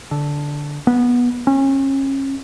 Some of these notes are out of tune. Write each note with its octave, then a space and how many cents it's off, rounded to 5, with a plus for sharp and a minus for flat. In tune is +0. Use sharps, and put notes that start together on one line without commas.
D3 -5
B3 -20
C#4 -30